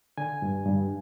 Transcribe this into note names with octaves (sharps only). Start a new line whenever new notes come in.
D3 G#5
G2
G2